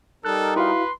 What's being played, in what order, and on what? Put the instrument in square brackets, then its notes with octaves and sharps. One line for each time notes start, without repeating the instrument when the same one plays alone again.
[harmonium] G3 D#4 A#4 [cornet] A4 [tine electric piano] F#6
[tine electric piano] E4 F#4 F5 [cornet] B4 [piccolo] C6